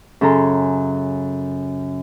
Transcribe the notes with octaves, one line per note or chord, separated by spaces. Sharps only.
F#2 C#3 A4 A#5 C6